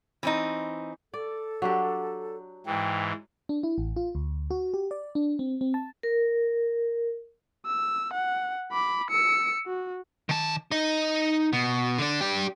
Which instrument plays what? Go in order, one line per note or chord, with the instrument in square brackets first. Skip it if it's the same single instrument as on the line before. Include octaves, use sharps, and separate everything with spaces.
[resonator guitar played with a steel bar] E3 C4 D#4
[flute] A4 [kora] D5
[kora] F#3 D4 G4
[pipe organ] G#2 E3 [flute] G5
[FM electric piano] D4
E4
A1
F4
D2
F#4
G4
D5
D4
C4
C4
A5
[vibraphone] A#4
[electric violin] E6
F#5
B5 D6
E6 C#7
F#4
[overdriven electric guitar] D#3 A5
D#4 D#5
B2
D3 D4
D4 G4